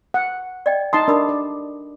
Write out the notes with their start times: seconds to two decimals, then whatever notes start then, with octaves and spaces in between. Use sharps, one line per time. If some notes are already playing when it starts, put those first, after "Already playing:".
0.14 F#5
0.66 D5 D#5 G5
0.93 D#4 A5 C6 D#6
1.08 D4 A#4 B5 D#6
1.29 D5